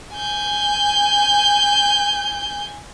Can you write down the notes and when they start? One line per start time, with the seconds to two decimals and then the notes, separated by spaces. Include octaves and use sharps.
0.15 G#5 G6